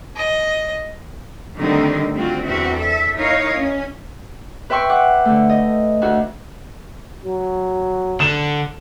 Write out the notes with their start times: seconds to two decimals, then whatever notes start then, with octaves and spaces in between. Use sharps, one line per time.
0.16 D#5
1.55 D3 D#3 G3 A3 C4 D#4
2.15 G3 C4 D4 F4 F#4
2.45 E2 C4 F#4 E5
2.77 A4 E5
3.15 D#4 E4 A#4 C#5 D#5 F5
3.55 C#4
4.70 B4 E5 G5 C6 C#6
4.89 F#5 D6
5.25 D3 A3
5.49 D#5
6.02 D2 F#4
7.25 F#3
8.20 D3 E7